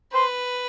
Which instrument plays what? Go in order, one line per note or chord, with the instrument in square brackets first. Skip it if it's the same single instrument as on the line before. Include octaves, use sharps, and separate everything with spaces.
[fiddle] B4 [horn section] C5